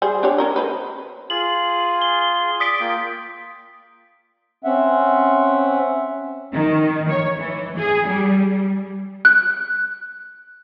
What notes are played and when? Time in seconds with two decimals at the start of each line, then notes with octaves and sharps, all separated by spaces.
0.02 G3 G#4 C5
0.23 D4 G4 C#5
0.38 C#4 A#4 D#5
0.56 B4 C5 D#5
1.30 F4 G#4 F#7
2.02 G7
2.60 D5 D#6 B6 D7
2.80 A#3 F4 G5
4.65 C4 C#4 E5 F#5
6.53 D#3
7.09 C#5
7.38 E3
7.77 G#4
8.08 G3
9.25 F#6